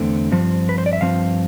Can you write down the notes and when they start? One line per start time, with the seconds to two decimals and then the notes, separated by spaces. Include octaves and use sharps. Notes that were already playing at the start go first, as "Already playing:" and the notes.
Already playing: E2 D3 A3 C4
0.32 G2 F3 C4
0.69 B4
0.78 C5
0.86 D5
0.93 E5
1.01 G2 F3 C4 F5